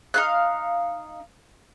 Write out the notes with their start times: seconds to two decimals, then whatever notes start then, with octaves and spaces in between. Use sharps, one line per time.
0.14 D#4 F5 F#6